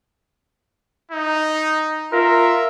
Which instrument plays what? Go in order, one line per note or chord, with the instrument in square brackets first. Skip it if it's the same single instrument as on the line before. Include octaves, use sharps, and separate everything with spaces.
[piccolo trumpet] D#4
[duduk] F4 [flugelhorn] A#4 [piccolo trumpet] E5